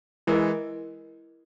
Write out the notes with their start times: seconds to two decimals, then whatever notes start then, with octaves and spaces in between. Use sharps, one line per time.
0.27 E3 G#3 E4 A#4 D#5